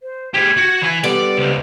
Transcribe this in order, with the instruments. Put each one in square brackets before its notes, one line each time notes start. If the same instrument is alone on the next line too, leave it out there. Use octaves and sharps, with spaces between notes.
[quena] C5
[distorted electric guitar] G#3 G4 [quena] G#6
[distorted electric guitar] F#4
E3 G#5
[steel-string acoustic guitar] D3 G3 B3 [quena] A4 [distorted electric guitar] D5
[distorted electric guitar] C#2 [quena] C5